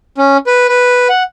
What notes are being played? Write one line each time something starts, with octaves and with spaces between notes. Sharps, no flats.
C#4
B4
B4
F#5